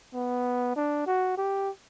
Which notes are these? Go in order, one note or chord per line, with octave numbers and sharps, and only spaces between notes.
B3
D4
F#4
G4